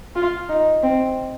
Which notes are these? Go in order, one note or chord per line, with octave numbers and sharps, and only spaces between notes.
F4
D#4
C4